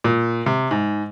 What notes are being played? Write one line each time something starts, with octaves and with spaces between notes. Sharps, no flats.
A#2
C3
G#2